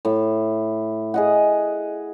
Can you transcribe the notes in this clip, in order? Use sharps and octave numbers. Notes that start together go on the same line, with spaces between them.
A2
G#4 D#5 F#5